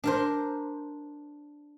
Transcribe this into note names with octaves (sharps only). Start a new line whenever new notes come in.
D4 A#4 C5